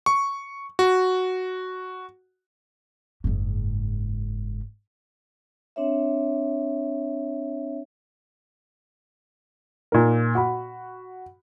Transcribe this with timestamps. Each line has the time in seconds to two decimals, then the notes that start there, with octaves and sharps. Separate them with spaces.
0.06 C#6
0.79 F#4
3.24 F#1 G#2
5.76 C4 D4 C#5 E5
9.92 A#2 D#4 A#4
10.35 F#4 B5